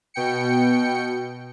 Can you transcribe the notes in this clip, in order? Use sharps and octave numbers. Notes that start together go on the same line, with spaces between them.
B2 G5 C#7